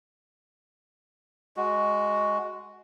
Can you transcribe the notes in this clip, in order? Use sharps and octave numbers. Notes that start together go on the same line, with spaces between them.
G#3 F#4